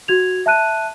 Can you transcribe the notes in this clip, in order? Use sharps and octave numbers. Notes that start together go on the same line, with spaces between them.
F#4 G#6 F7
E5 A5 F#6 D#7